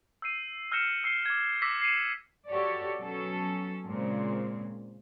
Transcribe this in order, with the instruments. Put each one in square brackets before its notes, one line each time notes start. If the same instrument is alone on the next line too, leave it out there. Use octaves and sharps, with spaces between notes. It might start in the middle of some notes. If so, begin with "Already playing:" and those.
[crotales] E6 G6 C7 D#7
E6 F6 G6 A#6 C#7 E7
E6 C7 D#7 G7
D6 G#6
D6 E6 A#6 B6
C7 C#7 D#7 E7
[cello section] F#4 G4 A4 C#5 D5
B2 F#3 C#4 A4
A#2 C#3 G#3 C4